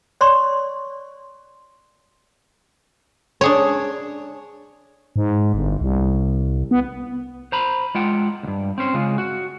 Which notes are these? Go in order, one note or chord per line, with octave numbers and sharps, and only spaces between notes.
C#5 D5 C6 C#6
D4 G#4 C#5
G#2
G1
C2
B3
C5 A#5 B5
G#3 F4 F#5 G5
D2 G2
C4 C#4 C5
C#3 G#3 F4
F#4